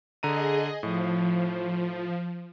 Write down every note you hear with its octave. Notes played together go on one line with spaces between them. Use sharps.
D3 G#4 D#5 A#5 D#7
A2 F3